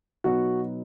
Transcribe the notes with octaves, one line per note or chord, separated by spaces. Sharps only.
B2 F#3 B3 D#4 F#4